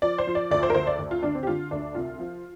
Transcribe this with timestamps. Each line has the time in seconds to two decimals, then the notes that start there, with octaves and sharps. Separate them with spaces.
0.02 F3 D5
0.18 C5
0.27 F3
0.35 D5
0.51 D2 D5
0.63 C5
0.70 A#4
0.75 D2 C5
0.87 D5
0.99 D2
1.11 F4
1.23 D3 D4
1.35 C4
1.43 G4
1.47 D3 F4
1.71 D2 D4
1.95 C2 F4
2.20 F3